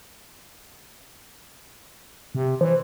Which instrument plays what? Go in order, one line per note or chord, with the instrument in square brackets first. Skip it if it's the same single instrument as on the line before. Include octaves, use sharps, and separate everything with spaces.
[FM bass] C3
[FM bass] E3 [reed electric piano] C5